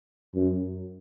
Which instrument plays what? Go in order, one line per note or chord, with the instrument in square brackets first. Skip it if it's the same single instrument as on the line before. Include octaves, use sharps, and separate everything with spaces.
[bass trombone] F#2